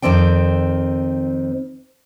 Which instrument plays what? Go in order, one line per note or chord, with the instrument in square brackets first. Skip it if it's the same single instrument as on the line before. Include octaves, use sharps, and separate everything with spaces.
[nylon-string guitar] F2 D#3 C4 D5 G5